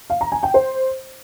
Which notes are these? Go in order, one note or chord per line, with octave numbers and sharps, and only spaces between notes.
F5
A#5
G#5
G5
C5